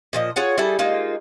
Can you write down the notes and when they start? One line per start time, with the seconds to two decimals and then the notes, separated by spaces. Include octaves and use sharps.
0.13 A#2 F3 D#5
0.36 F4 G#4 C#5 F#5
0.58 G3 E4 G#4 A4
0.79 G#3 A#3 D#4 F4